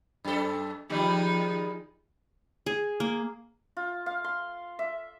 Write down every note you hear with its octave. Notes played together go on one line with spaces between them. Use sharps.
F#2 A4
D#3 F3 G3 G#3 D#4
G#4
A#3
F4
F5
C6
E5